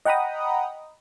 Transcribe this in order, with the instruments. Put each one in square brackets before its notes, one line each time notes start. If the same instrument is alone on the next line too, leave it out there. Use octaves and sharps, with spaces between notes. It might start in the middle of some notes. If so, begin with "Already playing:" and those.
[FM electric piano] D#5 F#5 G5 A#5 B5 D#6